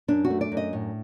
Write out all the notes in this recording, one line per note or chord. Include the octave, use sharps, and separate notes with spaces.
F#2 D4
F#4
A3
D5
F#2
D#5
A2